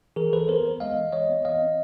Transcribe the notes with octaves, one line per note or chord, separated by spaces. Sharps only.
E3 G#4 A#4
E3 A4 B4
B3 A#4 C5
B3
G#3 D#5 F5
E3
E3 C#5 D#5
B3
E3 D#5 F5
C4